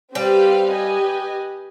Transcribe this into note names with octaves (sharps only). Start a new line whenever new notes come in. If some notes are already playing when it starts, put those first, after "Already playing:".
G3 C4 G4 B4 F5
G4 B4 D#5 G#5